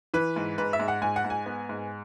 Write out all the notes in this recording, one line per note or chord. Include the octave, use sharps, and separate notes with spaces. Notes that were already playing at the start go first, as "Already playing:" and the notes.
E3 B4
G#2
G#2 B4
E5
G#2
F#5
G#2 G#5
F#5
G#2
G#5
B3
G#2